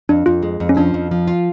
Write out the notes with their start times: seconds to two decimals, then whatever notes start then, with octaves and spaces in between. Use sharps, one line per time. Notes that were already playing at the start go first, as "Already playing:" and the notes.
0.09 F2 D4
0.26 F2 F4
0.43 G#3
0.60 F2
0.69 C#4
0.77 F3 D4
0.94 F2
1.11 F3
1.28 F4